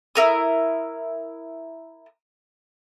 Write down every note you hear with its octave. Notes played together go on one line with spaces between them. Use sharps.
E4 A#4 D#6